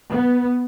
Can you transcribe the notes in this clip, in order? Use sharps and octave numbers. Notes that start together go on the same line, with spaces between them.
B3